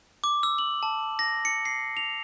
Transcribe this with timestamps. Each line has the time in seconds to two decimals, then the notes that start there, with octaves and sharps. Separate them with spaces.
0.24 D6
0.43 E6
0.58 F#7
0.83 A5
1.19 A#6
1.45 C#7
1.65 C7
1.97 F7